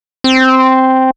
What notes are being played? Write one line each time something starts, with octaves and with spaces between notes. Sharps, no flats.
C4